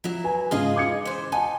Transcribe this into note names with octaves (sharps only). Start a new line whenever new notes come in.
F3 F#3 E4
B4 G#5
G#2 C#3 D#4 F4 G#4 D#5
D6 G#6 C#7
E3 C5
D#4 F#5 G#5 A5